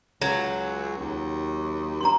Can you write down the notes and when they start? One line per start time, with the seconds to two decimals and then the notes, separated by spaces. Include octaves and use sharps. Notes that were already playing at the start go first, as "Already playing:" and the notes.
0.22 C#2 F#3
0.98 D#2
2.01 G2 A#5 C6